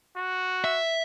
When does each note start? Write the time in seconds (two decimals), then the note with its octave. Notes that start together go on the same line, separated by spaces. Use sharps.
0.17 F#4
0.64 E5